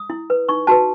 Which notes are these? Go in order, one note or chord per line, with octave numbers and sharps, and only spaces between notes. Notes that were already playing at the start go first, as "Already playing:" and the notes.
Already playing: D#6
E4
B4
D#4 C#6
F#4 B4 A5